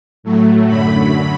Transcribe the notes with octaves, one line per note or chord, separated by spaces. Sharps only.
A2 F#3 A3
F#2 D3 F#3 B5